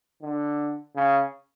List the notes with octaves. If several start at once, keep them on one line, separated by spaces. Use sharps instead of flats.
D3
C#3